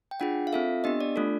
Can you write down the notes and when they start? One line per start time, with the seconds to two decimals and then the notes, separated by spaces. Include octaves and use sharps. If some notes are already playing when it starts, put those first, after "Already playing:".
0.11 G5
0.20 D4 F4 G#4 F#5
0.47 F5
0.53 C4 F4 A4 E5
0.84 B3 D4 G4 D#5
1.01 D5
1.16 A3 D4 F4 A4